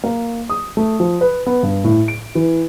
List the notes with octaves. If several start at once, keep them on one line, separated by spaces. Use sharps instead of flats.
A#3
D#6
A3
F3
B4
B3
G2
A2
D7
E3